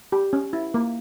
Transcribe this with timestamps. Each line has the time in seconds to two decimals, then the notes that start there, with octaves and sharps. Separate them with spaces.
0.12 G4
0.33 C#4
0.53 E4
0.74 A#3